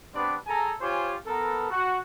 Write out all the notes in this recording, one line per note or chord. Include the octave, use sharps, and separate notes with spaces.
G3 B3 C4 D4 B4 D5
G#4 A4 G#5 A#5
F4 G4 C5 C#5 G#5
B3 A4 A#4
F#4